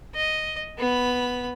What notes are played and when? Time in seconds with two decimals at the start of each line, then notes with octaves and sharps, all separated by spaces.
0.14 D#5
0.78 B3 B5